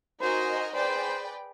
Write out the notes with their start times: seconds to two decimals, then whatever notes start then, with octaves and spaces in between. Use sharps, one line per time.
0.20 D#4 F#4 A#4 C5 D#5 G#5
0.74 G#4 B4 C5 D5 G5